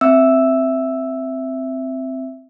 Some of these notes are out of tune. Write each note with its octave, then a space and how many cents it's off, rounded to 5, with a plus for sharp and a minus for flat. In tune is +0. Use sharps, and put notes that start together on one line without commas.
C4 +0 E5 +0 E6 +0